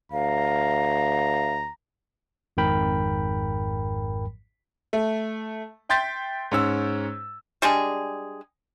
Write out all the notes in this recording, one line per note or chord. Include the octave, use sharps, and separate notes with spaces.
D2 F5 A#5
G#1 F2 G#2 A#4 G5 B5
A3
E5 G5 C6 G6 A6 B6
G#2 C#4 E6
G3 G#3 D4 G#4